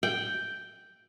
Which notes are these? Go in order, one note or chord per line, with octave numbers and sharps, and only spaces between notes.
G5